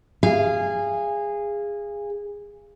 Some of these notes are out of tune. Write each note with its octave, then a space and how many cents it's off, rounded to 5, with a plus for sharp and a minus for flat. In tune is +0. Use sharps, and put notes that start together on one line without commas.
G#4 -20 F5 -20